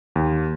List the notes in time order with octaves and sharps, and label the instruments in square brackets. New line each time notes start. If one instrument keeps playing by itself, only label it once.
[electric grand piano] D#2